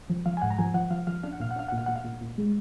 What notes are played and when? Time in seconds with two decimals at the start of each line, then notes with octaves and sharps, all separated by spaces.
0.10 F3
0.26 F3 F5
0.37 G#5
0.42 G#2 F#5
0.50 A#5
0.58 F3 G#5
0.74 F3 F#5
0.90 F3 F5
1.07 F3 F5
1.23 D4 F5
1.33 F#5
1.40 A#2 F5
1.51 F#5
1.56 D4 F5
1.68 A#2 F#5
1.78 F5
1.86 A#2 F#5
1.96 F5
2.05 A#2
2.21 A#2
2.38 G#3